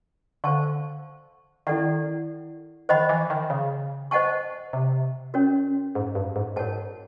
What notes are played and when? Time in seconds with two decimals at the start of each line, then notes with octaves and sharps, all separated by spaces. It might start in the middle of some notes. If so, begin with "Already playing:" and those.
0.44 D3 C5 F5 A5 C#6
1.67 D#3 E4 A4 D5 F#5
2.89 D#3 C5 D#5 F#5 B5
3.09 E3
3.30 D#3
3.50 C#3
4.11 C5 D#5 F#5 A5 C#6
4.73 C3
5.34 C#4 F#4 A#4 C#5
5.95 G#2
6.15 G2
6.36 G#2
6.56 G#2 F#4 A#4 C#5 F#5 A5